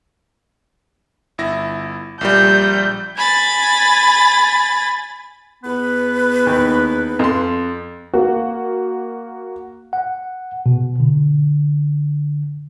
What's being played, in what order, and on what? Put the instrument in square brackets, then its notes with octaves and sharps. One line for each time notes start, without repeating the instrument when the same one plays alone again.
[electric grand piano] G1 E4 A#6
[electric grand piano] A#1 A#2 G3 [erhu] G6
[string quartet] G#5 B5 A6
[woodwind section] E2 B3 B4
[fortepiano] D#2
F2 C6
[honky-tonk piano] A#3 F#4
[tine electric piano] F#5
B2
D3